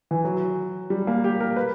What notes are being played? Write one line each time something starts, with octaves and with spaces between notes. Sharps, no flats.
E3
F#3
G3
A#3
G4
A#4
B4